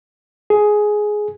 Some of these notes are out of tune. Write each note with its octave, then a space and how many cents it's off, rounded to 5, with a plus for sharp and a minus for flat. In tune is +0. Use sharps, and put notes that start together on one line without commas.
G#4 +10